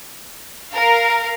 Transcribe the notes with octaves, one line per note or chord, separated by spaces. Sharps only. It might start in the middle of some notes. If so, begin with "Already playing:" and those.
A#4 F5